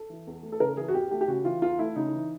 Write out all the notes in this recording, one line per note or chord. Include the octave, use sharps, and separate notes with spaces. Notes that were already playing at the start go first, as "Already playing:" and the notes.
Already playing: A4
E3
E2
A3
A4
C#3 A#4
E3 G#4
F#4
E2 G4
A3 G4
G4
C#3 F#4
E3 F4
E2 F4
A3 E4
C#3 D#4
E3